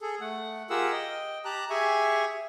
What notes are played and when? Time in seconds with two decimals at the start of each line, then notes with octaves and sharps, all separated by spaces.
0.01 G#4 A4
0.21 A3 F#5
0.70 F4 G4 G#4 A#4 F#5 E6
0.92 D#5 G5
1.45 G4 A5 A#5 F#6
1.70 G4 G#4 E5 G#5 C#6